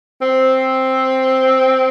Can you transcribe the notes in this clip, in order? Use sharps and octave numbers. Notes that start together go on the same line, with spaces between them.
C4